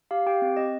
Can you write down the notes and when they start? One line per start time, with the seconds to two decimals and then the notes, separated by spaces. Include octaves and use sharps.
0.11 G4 F5
0.26 G4 G5
0.42 C4
0.57 C4 D#5